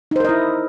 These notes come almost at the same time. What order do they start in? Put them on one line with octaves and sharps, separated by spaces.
D#4 C5 A#4 D#5 E4